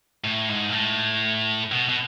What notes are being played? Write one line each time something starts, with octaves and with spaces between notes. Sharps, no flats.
A2
G#2
A#2
A2
B2
B2